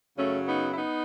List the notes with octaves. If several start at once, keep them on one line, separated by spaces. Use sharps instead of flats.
F#2 C#3 F#3 A3 C#4
B3 D#4
E4
B3 D#4